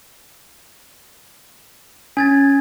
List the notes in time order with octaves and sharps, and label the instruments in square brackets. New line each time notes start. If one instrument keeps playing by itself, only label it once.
[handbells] C#4 [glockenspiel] G#5 G#6 A6